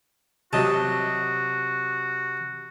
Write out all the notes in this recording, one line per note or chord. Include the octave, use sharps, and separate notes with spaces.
C3 F#3 F#4 D#5 A5